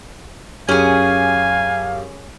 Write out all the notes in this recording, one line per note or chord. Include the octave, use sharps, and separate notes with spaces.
F#2 C#4 G4 G#4 F5 G#5